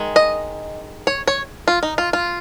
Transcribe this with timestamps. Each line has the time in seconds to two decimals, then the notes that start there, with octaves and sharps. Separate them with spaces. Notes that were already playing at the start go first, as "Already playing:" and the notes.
Already playing: D#3 G#3
0.16 D#5
1.07 C#5
1.28 C#5
1.68 F4
1.83 D#4
1.98 F4
2.13 F4